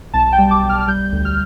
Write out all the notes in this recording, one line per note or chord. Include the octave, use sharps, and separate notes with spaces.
B1 A5
G5
G3
D6
B1
F6
F6
G3 G6
D2
F6